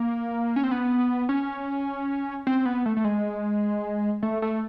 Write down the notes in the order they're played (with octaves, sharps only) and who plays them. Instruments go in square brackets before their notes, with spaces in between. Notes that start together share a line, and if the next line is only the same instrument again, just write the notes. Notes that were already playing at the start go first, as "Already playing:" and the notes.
Already playing: [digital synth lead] A#3
C#4
C4
B3
C#4
C4
B3
A3
A3
G#3
A3
A3